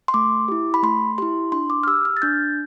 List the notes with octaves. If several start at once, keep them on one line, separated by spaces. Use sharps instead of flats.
C6
A3 D6
E4 G4
B5
A3 C6
E4 G4 C6
D4 C6
D6
F6
G4 E6
F6
A6
D4 G6